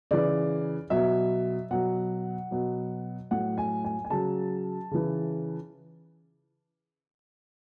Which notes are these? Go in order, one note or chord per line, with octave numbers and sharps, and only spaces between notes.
C#3 E3 D5
B2 F#3 E5
B2 F#3 F#5
B2 F#3
A2 F#3 F#5
G#5
G#5
G#5
C#3 F#3 A5
C#3 E3